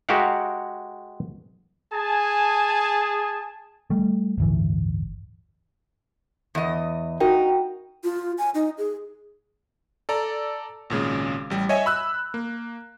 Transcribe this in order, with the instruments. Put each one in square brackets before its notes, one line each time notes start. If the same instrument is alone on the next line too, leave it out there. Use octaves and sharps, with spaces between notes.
[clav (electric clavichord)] G#3 F#4 G4 A#4 F5 F#5
[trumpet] G#4 [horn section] G#5 A5
[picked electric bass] G3 A3
D1 G1 E3
[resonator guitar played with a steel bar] E2 D#5
[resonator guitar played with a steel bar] D#4 [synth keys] F#4 A#4 G5
[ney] F4
G#5
D#4
G#4
[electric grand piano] A4 D5 A#5
G#1 A#2 C#3 G#3
A1 G3
C#5 D#5 E5 G#5
B5 E6 F#6
A#3